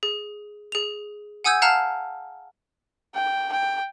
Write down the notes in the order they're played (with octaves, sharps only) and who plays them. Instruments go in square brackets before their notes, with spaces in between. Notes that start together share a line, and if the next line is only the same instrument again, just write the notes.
[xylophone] G#4
G#4 F7
F#5 G#5 D#6 E6 G6 G#6
F5 F#5 A5 A#5 F6 F#6
[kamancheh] G5
G5